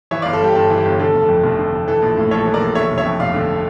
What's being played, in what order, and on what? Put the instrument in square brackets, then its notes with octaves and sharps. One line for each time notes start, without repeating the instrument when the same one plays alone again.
[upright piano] E3 C#5 E5
D5 F5
G1
A4
G2 G4
G1 A4
E3
G4
G1
D3 A4
F1
A4
F2
F1
D3
F1
E3 A4
A#1
A2
A#1 A4 C#5
E3
A#4 D5
A#1
D3 C#5 E5
F1
C#5 E5
F2
F1 D5 F5
D3